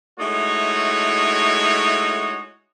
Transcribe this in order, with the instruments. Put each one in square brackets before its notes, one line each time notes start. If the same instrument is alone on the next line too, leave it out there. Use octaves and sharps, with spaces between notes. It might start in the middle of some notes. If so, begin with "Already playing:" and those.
[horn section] G#3 A3 D#4 E4 F#4 C#5